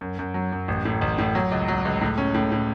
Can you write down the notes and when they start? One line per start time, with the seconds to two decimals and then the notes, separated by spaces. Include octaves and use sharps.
0.01 F#2
0.19 F#2
0.34 F#3
0.52 F#2
0.68 A1
0.85 A2
1.01 A1
1.18 A2
1.35 F#3
1.52 C#2
1.68 F#3
1.85 C#2
2.01 A2
2.18 C#4
2.34 A2
2.52 A2